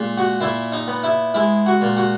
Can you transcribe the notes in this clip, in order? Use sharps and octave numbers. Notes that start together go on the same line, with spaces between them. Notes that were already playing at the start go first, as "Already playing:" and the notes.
Already playing: A#2 G#3
F#4
A#2 E4
D#4
B3
E4
G#3 E4
F#4
A#2
F#4